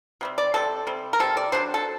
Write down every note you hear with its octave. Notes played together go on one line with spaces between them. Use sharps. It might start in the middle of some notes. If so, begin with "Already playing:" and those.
C3 G3 C4
D5
C3 G3 C4 A4
C3 G3 C4
A#4
C3 G3 C4 A4
D5
F#3 A3 D4 C5
A4